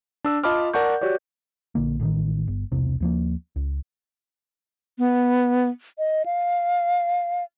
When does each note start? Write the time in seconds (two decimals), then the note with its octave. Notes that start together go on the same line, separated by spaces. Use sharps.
0.25 D4 E6
0.44 F4 D#5 A5 B5 D6 F6
0.74 A#4 D5 F#5 A5 C#6 G6
1.01 F#4 G4 C#5 D5
1.75 A#1 D3 A#3
2.00 A1 A2 C3 D#3
2.48 G1
2.72 E1 C2 C3
3.00 D#2 F3 A#3
3.56 C#2
4.98 B3
5.98 D#5
6.26 F5